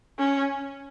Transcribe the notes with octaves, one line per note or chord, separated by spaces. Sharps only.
C#4